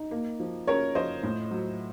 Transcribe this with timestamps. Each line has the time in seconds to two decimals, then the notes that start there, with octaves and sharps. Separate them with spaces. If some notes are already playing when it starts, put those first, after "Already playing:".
Already playing: D#4
0.11 A#3
0.40 F3
0.67 C#4 A#4 C#5
0.95 F3 C5 D#5
1.23 A2
1.51 F#3